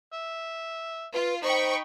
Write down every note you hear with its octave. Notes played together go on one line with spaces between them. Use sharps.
E5
F4 B4
D#4 C5 G5 B5 C#6